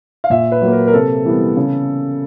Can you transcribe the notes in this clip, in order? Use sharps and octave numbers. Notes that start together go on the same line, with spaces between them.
F5
A#2 E5
B4
F#3 A#3
A#4
A#4
C3 A4
E3 G3 B3
C#3